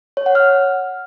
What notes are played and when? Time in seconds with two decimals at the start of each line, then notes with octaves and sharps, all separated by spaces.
0.17 C#5
0.26 F#5
0.35 F6